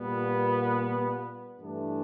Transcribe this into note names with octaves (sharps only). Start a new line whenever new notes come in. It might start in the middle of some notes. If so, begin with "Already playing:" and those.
Already playing: A#2 G3 B3
G2 E3 A3 D4